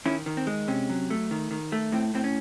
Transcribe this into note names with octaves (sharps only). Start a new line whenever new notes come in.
D#3 C#4 E4
D#3
C4
G#3
C3 C#4
F#3
A3
D#3
D#3
A3
A2 C4
A2 C4
C#4